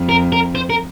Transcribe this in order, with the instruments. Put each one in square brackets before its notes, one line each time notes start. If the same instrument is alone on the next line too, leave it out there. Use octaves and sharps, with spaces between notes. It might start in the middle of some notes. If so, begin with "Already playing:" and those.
Already playing: [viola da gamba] F2
[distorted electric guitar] A#4
A#4
C5
A#4